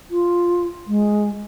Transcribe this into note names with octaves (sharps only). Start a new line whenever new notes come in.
F4
G#3